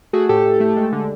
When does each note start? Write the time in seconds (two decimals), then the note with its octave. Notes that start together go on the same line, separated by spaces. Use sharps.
0.13 A3 F#4 G#4
0.29 A2 G4 A4
0.45 A2
0.60 A3
0.77 G#3
0.92 D3